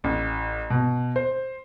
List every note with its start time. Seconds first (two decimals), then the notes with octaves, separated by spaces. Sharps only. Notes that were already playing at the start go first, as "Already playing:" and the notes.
0.04 A1
0.70 B2
1.16 C5